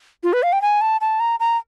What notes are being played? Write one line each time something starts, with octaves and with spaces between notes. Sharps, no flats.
F4
B4
F5
G5
G#5
A5
A5
A#5
A#5